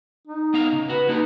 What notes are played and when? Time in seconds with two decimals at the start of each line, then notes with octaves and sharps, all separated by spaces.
0.27 D#4
0.54 B3 F5 A#5
0.73 C#3
0.90 F#4 B4
1.09 A#3 D#4 G4 A4